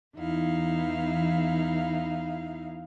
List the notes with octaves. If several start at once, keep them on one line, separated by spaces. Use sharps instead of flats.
E2 D#4 E4 F5